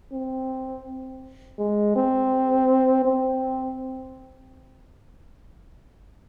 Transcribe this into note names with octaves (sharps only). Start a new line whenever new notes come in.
C4
G#3
C4
C4